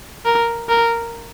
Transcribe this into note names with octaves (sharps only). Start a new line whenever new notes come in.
A#4
A#4